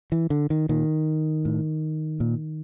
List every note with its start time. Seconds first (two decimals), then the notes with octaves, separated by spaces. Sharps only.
0.12 E3
0.30 D3
0.50 D#3
0.69 A#2 D#3
1.45 A2
2.20 A#2